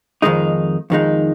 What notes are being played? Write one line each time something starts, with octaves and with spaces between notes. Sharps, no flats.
F2 D#3 G#3 D#4
F2 D#3 G#3 D#4